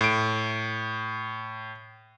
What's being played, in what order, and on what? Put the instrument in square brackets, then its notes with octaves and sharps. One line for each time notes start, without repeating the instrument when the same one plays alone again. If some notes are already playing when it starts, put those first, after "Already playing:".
[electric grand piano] A2 D7